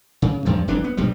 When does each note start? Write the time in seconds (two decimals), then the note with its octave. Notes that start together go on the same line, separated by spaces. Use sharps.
0.22 C#3
0.45 E2 G2 F3
0.68 F1 C2 E3 D4
0.84 B3
0.97 B1 G2 F3 G3